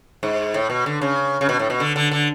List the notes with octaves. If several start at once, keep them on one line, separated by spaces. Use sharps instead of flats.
G#2
A2
B2
D3
C#3
C#3
B2
A2
B2
D3
D3
D3